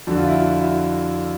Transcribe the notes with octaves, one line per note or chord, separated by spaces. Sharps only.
F2 D3 F3 F#4
F4
E4 F#4
E4 F#4